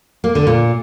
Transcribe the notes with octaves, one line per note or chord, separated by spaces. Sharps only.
A#3
D3
A#2